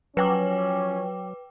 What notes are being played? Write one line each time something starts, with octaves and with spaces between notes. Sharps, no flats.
F3 F#3 C#4 B4 G5 D6